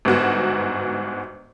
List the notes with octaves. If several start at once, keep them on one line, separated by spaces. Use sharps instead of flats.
G1 G#2 B3 F#4